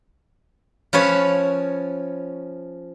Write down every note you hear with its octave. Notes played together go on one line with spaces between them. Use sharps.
F3 C#4 B4 C#5